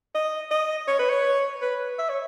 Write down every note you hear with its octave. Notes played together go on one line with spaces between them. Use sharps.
D#5
D#5
C#5
B4
C#5
B4
E5
C#5